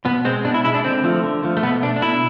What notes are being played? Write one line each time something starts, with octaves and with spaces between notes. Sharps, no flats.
B2 B3
G#3 C4
B2 D4
E4
G#3 E4
D4
D3 C4
F3 A3
D3
F3 A3
A3
B2 B3
A3 D4
D4
B2 E4